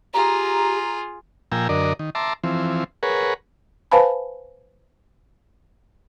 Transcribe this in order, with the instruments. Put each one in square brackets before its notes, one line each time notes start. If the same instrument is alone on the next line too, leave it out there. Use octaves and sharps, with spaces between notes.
[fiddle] F4 G#4 [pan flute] G4 [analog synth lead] A#5
[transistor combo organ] A#2 F3 G5 G#5 A#5 E6
F#2 D3 A#4 D5 D#5
D#3
E5 A5 A#5 C6 D6
E3 F3 C4
G#4 A#4 B4 C#5 F#5
[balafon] B4 C5 F5 G#5 A5 B5